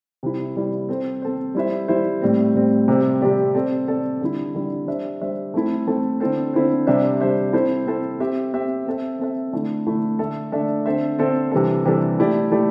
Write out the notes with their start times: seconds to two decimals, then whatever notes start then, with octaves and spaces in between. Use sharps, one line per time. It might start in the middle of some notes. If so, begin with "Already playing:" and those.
0.23 C3 G3 E4
0.56 C3 G3 E4
0.89 C4 A4 C5
1.22 C4 A4 C5
1.55 G3 E4 C5 E5
1.88 G3 E4 C5 E5
2.22 A2 G3 C4
2.55 A2 G3 C4
2.88 C3 G3 C4 G4 D5
3.21 C3 G3 C4 G4 D5
3.55 C4 A4 D5
3.88 C4 A4 D5
4.21 D3 G3 E4
4.54 D3 G3 E4
4.87 G3 D4 C5 E5
5.21 G3 D4 C5 E5
5.54 A3 C4 E4 A4
5.87 A3 C4 E4 A4
6.20 D3 C4 E4 A4 C5
6.54 D3 C4 E4 A4 C5
6.87 C3 G3 D4 C5 E5
7.20 C3 G3 D4 C5 E5
7.53 C4 E4 A4 C5
7.86 C4 E4 A4 C5
8.20 C4 G4 E5
8.53 C4 G4 E5
8.86 C4 A4 E5
9.19 C4 A4 E5
9.53 D3 A3 E4
9.87 D3 A3 E4
10.19 D3 A3 D4 A4 E5
10.52 D3 A3 D4 A4 E5
10.86 D3 C4 A4 C5 E5
11.19 D3 C4 A4 C5 E5
11.52 C3 E3 G3 D4 A4
11.85 C3 E3 G3 D4 A4
12.19 A3 E4 G4 D5
12.52 A3 E4 G4 D5